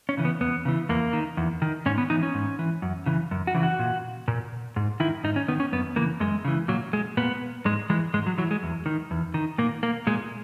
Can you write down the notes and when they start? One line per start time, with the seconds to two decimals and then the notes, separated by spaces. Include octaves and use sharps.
0.09 C#4
0.17 C#3 E3
0.25 B3
0.41 E2 B3
0.65 C#3 E3
0.89 E2 A#3
1.13 D#3
1.37 E2
1.62 D#3
1.86 G#2 C#4
1.98 B3
2.10 E3 D#4
2.23 C#4
2.35 G#2
2.59 E3
2.82 F#2
3.06 C#3 E3
3.31 F#2
3.47 F#4
3.55 C#3 E3
3.63 F#4
3.79 A#2
4.28 A#2
4.76 G#2
5.00 D#3 E4
5.24 G#2 D#4
5.36 C#4
5.48 D#3 B3
5.60 C#4
5.72 F#2 B3
5.96 C#3 E3 A#3
6.20 F#2 G#3
6.45 C#3 E3
6.68 A#2 F#3
6.93 G#3
7.17 A#2 B3
7.65 G#2 G#3
7.90 E3 G#3
8.14 G#2 G#3
8.26 F#3
8.38 E3 F#3
8.51 G#3
8.63 E2
8.86 D#3
9.11 E2
9.34 D#3
9.58 A#2 A#3
9.83 A#3
10.07 A#2 G#3